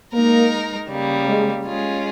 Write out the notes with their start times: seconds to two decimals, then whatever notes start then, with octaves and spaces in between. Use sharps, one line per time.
0.13 G#3 A#3 D#4 A#4
0.90 C#3 G3 A#3
1.28 G#3
1.66 G#3 C#4 F4 G#4